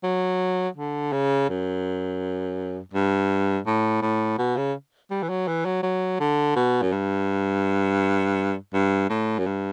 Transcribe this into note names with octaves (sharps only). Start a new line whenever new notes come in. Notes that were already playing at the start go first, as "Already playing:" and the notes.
F#3
D3
C#3
F#2
G2
A2
A2
B2
C#3
G3
E3
F#3
E3
F#3
F#3
D3
B2
F#2
G2
G2
A2
F#2
G2